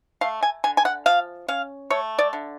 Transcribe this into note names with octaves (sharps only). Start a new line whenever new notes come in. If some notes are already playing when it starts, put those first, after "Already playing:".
A3 F5
G#5
D3 G#5
G#5
F#5
F3 F5
C#4 F5
A3 C#5
D5
D3